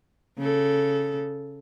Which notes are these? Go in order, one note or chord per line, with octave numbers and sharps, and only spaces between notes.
C#3 A4